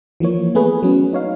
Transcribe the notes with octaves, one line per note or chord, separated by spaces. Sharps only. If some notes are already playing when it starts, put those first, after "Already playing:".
E3 F3 A#3 C#5
A3 B3 G#4 B4
F#3 C#4
D#4 C#5 F5